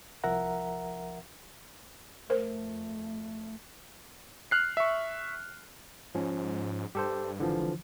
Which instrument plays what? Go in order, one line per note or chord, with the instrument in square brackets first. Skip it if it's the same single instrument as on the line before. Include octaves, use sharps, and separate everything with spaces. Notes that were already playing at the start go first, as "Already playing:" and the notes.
[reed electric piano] C2 F3 A#4 E5 F#5 A#5
[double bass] F2 A3 [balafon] A#4 C5
[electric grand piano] F6 F#6 C7
E5 C#6
[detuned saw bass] G#2 [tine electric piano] F3 C#4
[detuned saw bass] G2 [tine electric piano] G4 A4 C5
[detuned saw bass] G#1 [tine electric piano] D3 E3 F3